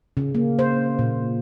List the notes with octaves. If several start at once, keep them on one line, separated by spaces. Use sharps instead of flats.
C#3
A#3
C5
A#2